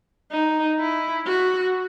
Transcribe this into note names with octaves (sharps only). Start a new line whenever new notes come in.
D#4
E4
F#4